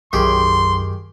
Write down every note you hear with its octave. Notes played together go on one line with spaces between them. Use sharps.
B1 F#2 D#3 G4 G#4 C6